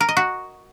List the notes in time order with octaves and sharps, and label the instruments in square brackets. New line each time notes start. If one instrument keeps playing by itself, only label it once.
[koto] A#4
D#5
F#4